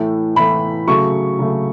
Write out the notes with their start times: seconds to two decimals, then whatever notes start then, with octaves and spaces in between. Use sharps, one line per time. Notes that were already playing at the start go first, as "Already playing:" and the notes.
Already playing: A2 E3 A3
0.36 A2 E3 A3 B5
0.87 C#3 F#3 A3 C#6
1.39 C#3 F#3 A3